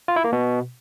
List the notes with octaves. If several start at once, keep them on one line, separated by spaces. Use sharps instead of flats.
F4
E4
A#3
B2